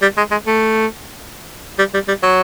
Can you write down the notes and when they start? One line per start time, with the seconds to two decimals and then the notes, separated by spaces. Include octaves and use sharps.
0.02 G3
0.17 G#3
0.31 G#3
0.47 A3
1.79 G3
1.94 G3
2.08 G3
2.23 F#3